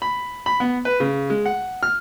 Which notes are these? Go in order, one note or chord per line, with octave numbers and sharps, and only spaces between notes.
B5
B5
B3
B4
C#3
G#3
F#5
F6